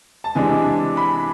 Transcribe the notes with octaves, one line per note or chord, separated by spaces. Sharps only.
A5
C3 E3 G#3 D4 G#5
B5